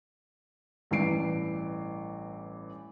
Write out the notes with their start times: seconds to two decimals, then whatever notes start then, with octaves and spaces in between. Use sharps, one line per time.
0.91 A1 G2 E3 C7 D7